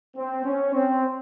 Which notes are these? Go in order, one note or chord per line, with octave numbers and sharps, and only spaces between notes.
C4
C#4
C4